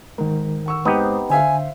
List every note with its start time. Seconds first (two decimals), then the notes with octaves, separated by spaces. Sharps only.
0.18 G#2 D#3 A#4
0.66 F#5 C#6 E6
0.85 G#2 B3 C4 D#4 G4
1.30 D3 C5 E5 F5 G#5